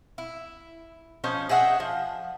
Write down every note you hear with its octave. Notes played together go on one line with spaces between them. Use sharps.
E4
F3 C#4 D#4 C5
G#4 D#5 E5 F#5
F3